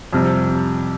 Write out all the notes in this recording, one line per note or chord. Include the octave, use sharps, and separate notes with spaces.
F2 C3 G3